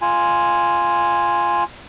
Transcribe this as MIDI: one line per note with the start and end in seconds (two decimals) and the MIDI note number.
0.02 1.64 65
0.02 1.64 80